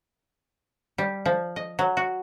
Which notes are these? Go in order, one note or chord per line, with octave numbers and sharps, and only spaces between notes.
G3
F3
D#5
F#3
F#4